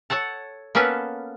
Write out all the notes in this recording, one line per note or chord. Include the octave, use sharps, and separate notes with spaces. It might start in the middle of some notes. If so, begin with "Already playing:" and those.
A4 C#5 F#5 A5
A#3 B3 C#4 A4 B4